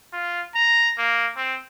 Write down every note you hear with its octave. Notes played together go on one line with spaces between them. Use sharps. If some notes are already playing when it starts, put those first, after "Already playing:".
F4
A#5
A#3
C4